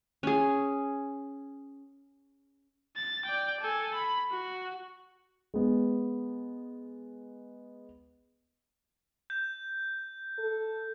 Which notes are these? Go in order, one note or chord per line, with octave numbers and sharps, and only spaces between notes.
C#4 G#4
A6
D5 G5
A4 G#5
B5
F#4
G#3 B3
G6
A4